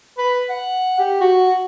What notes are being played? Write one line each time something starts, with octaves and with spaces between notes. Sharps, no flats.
B4
F#5
G4
F#4